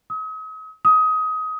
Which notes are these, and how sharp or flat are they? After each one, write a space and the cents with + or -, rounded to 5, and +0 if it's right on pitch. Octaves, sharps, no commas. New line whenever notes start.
D#6 +40
D#6 +20